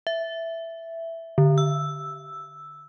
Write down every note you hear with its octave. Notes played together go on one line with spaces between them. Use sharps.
E5
D3
E6